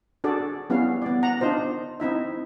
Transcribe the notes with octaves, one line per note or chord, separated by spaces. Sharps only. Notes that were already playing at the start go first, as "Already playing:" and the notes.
D4 F#4 G#4 A4 D5
G3 B3 C#4 E4 F5
B3 D5
F#5 A#5
D4 D#4 F4 C5
C4 D#4 E4 E5